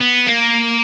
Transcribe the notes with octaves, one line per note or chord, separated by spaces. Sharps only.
B3
A#3